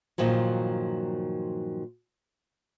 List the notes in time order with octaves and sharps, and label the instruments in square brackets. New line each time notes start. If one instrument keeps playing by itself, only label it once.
[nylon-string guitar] G2 A#2 D#3 F3 F#3